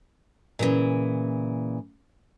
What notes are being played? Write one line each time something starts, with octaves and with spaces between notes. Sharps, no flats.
A#2 C#3 E3